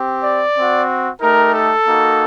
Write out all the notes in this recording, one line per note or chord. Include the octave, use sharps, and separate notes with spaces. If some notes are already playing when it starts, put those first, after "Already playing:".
Already playing: C4 G4
D5
C4 F#4
A3 D#4 G4 A#4
A4
A#3 D#4 F#4